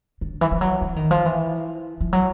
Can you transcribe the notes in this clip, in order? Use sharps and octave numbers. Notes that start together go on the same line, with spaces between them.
D3
E3
F3
F#3
E3
D#3
F3
E3
F3
F#3